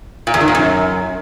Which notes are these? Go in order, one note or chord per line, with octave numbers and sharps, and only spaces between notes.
A#2
E2
D#3
A#2
F#2